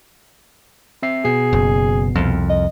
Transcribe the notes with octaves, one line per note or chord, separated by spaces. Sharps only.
C4 E5 C7
B2 B3 G#4 C7
F#1
C2 F2
D#5